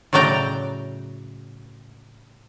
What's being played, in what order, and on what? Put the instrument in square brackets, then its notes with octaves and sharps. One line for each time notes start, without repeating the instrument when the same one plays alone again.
[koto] A2 C#3 F#3 D5 G5 A#5